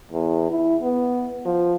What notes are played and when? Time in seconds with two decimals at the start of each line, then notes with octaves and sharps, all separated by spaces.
0.12 E2
0.50 E4
0.82 B3
1.45 F3